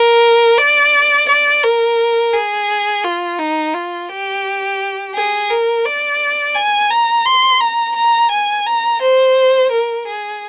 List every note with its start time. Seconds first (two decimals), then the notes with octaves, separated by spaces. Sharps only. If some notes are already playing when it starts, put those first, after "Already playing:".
Already playing: A#4
0.58 D5
1.28 D5
1.63 A#4
2.33 G#4
3.04 F4
3.39 D#4
3.74 F4
4.09 G4
5.14 G#4
5.50 A#4
5.85 D5
6.55 G#5
6.90 A#5
7.26 C6
7.61 A#5
7.95 A#5
8.31 G#5
8.66 A#5
9.02 C5
9.71 A#4
10.07 G#4